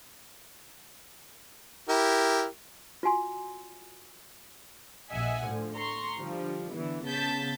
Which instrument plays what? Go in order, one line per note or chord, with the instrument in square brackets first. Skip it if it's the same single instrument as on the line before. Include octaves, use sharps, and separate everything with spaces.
[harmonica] E4 G4 A#4
[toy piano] F4 F#4 G#5 C6
[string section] A#1 D#5 E5 F#5 G#5
A2 D3 F3
A#5 C6 C#6
D3 F3 G3
D3 E3 B3
C#3 B3 A5 G6 A6 B6